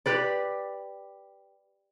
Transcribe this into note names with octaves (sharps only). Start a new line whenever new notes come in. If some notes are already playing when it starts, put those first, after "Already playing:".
G4 B4 D5